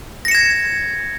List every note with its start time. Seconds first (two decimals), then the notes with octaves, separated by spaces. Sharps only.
0.25 A#6
0.28 C#7
0.31 E7
0.35 G#6